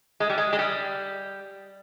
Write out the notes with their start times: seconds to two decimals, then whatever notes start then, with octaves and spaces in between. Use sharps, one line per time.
0.20 G#3
0.29 G3
0.38 G#3
0.53 G#3
0.59 G3